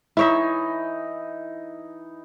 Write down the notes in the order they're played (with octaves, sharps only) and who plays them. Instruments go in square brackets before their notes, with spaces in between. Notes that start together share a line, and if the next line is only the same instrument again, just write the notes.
[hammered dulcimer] E3 D#4 [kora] E4 C#5 E5